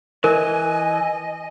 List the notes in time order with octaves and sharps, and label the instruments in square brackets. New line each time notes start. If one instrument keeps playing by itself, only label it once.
[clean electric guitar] E3 [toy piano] A#4 [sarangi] D#5 [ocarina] G#5